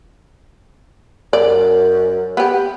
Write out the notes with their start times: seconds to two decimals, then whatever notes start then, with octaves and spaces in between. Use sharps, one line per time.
1.33 F#2 D5
2.37 B3 G4